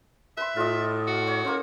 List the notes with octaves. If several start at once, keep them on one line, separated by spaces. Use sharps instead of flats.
B4 E5 C6
A2 F4 D#5
F#4
C#5
A#3 C#4 C5